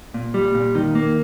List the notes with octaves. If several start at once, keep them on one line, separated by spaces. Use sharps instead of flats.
A#2
G3
A#2
D#3
A#3